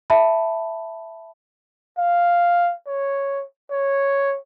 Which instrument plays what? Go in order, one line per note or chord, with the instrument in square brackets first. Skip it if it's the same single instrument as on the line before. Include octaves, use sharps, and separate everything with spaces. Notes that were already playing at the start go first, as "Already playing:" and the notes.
[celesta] E5 A5 B5
[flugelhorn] F5
C#5
C#5